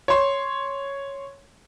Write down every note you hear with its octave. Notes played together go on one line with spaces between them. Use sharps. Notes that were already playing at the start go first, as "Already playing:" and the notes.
C#5 C6